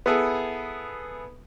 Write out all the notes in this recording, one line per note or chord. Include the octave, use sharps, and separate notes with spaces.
B3 E4 G#4 A4